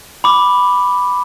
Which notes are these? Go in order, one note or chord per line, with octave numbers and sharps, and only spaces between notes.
B5 D6